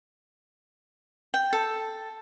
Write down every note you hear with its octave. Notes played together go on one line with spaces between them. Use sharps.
G5
A4